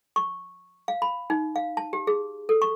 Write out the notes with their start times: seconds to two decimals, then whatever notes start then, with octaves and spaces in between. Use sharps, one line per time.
0.16 C#6
0.88 F5
1.02 B5
1.30 D#4
1.56 F5
1.77 A5
1.93 G4
2.07 G#4
2.49 A4
2.62 C#6